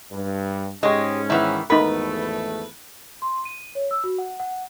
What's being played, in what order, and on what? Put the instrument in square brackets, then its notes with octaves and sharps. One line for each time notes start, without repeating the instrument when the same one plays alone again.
[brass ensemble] G2
[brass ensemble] G#2 C#4 [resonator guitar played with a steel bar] G#3 G4 [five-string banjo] C#5 D#5
[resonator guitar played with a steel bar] D#3 E3 [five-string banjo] B3 E4
[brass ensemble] G#1 E2 A3 [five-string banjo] B3 [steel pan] D#4 A#4 B5 [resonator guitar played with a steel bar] B4
[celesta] C6
D#7
C#5
E6
F#4
F#5
F#5